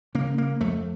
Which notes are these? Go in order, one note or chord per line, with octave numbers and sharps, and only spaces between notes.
C#3 A#3
A#3
F2 A3